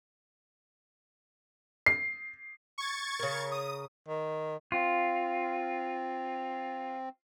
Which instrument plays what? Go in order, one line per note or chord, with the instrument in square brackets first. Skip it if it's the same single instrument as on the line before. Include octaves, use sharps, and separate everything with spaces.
[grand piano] C7
[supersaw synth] C#6 G#6 A6
[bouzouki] C#3 A#4
[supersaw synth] D#6
[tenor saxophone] D#3
[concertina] C4 [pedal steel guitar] F4